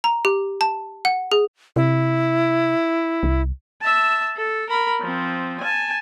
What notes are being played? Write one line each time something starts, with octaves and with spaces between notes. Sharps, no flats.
A#5
G4
A5
F#5
G#4
C3 E4
C2
E5 A5
A4
A#4 B5
F3 C4
G#5 A5